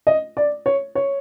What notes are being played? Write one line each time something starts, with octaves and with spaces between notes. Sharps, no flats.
D#5
D5
C#5
C#5